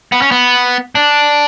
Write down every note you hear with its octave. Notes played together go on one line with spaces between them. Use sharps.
B3
C#4
B3
D4